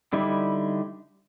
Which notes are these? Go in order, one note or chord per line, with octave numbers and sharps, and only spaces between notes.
D3 G3 D#4 E4